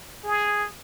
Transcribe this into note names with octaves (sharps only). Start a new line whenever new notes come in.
G#4